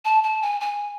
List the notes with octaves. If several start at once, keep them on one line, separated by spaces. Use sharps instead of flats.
A5
A5
G#5
G#5